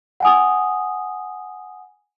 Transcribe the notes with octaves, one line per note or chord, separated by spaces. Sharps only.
F#5 G#5 D#6